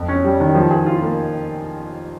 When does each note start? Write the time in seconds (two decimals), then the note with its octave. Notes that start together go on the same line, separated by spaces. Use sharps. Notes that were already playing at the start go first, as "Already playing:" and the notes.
Already playing: F2
0.08 C#4
0.24 G3
0.40 D#3
0.55 F3
0.71 G#4
0.86 F4
1.02 A#3